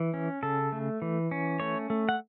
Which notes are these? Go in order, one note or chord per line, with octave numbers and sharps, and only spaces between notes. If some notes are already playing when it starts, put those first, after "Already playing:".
Already playing: E3
C#4
C#3 A4
A3
E3
C#4
A3 C#5
A3
F#5